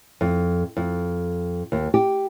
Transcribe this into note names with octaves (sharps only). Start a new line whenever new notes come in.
F2
F2
D#2
G4